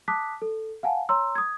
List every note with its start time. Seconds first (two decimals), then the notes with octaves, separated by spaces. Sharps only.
0.08 A5 D6 D#6 F#6 B6
0.42 A4
0.83 F5 F#5 G#5 A5
1.09 C#5 A#5 C6 E6
1.35 D#6 G#6